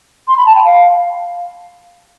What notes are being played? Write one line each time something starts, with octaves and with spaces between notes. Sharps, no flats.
C6
B5
A5
G5
F5